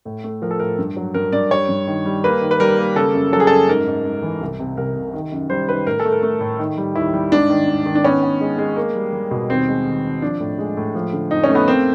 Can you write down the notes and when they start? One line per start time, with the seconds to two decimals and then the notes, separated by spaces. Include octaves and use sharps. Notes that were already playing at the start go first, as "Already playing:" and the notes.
0.05 A2
0.24 A3
0.42 F3 A#4
0.51 A4
0.60 A2 A#4
0.78 G2
0.97 F#3
1.14 G2 A#4
1.32 G2 D5
1.51 G3 C#5
1.69 G2
1.87 D#3
2.06 G3
2.24 A#3 B4
2.41 D#3
2.51 B4
2.60 G3 A#4
2.78 A#3
2.96 C#3 A4
3.14 F#2
3.33 F#3 A4
3.40 G#4
3.47 A4
3.51 F#2
3.69 G#2 A#4
3.87 G#2
4.05 G#2
4.23 E3
4.41 C2
4.59 C3
4.77 C2 A#4
4.96 C3
5.13 D#3
5.32 F#2
5.50 G3 C5
5.69 D#3 B4
5.86 A2 A#4
6.00 A4
6.05 A3
6.12 A#4
6.23 A3
6.40 A2
6.59 D#3
6.78 G3
6.95 D#2 E4
7.14 G3
7.32 G#2 D4
7.50 D#3
7.68 G#2
7.86 D#3
7.95 D4
8.04 B3 C#4
8.23 B3
8.41 G#3
8.58 G#3
8.76 A#3
8.95 G3
9.13 G3
9.31 B2
9.50 D#2 C4
9.68 G#3
9.86 D#3
10.04 D#3
10.22 F3 D4
10.40 A2
10.59 G#3
10.77 A2
10.95 F3
11.13 D3
11.31 F2 D#4
11.43 C#4
11.49 A3
11.55 B3
11.68 A#3 C4